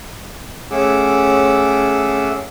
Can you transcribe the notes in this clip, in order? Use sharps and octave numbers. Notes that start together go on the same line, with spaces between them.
A3 C#4 G#4 F#5 D6 E6